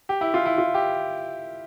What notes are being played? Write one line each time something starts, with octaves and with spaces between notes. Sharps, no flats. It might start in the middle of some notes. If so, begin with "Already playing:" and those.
G4
E4
F4
E4
F4
G4